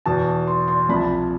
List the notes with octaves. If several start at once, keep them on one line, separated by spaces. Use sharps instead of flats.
E2 B2 A5
C6
C6
C2 C3 F3 B5
A5
B5